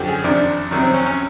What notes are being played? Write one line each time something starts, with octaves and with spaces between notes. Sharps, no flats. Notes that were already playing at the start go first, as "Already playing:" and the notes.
Already playing: F#2 D3 F3 G4
G#4
F2 C3 D#3 D4
F2 C3 D#3 F#3
C4
C#4
C#4